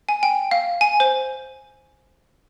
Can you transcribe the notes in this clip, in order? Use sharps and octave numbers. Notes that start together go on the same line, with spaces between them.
G#5
G5
F5
G#5
C5